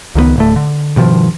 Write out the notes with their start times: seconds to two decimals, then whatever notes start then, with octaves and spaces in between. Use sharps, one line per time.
0.15 C#2 D#3 G3 B3
0.36 D1 D2 A3
0.56 D3
0.96 G2 B2 D#3 F3